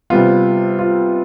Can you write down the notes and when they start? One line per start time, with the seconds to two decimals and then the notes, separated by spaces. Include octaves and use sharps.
0.10 C3 G3 B3 F4
0.79 F4